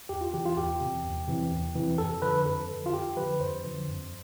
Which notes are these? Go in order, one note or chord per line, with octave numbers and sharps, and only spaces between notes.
E2 G4
F4
C3 E3 G4
F4
E2 G4
C3 E3
E2
C3 E3
E2
C3 E3
F2 A4
D3 F3 B4
B4
F2 A4
D3 F3
F4
F2 G4
D3 F3 B4
F2 C5
D3 F3
F2